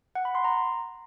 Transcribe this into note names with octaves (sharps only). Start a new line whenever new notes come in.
F#5
B5
C6
A#5